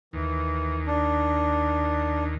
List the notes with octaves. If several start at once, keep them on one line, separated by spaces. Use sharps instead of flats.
D#2 E3
D4